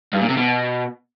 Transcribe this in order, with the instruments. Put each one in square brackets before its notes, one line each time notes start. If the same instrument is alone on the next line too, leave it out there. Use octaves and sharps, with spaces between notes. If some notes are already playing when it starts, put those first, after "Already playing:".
[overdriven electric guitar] G2
A#2
C3
B2